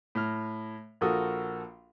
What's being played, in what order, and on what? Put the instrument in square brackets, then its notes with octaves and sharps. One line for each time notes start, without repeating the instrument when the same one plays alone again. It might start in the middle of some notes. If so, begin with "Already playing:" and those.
[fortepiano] A2 F6
A#1 F3 F#4 A4 A#4 D#6